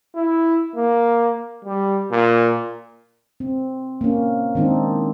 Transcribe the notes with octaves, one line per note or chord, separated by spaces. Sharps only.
E4
A#3
G3
A#2
C4
A#3 C#4
D#3 G#3 C4 D4 D#4